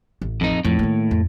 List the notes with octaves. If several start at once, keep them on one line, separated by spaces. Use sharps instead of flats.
A1
F2 D#4
F2 A2
D#3 A#3
F2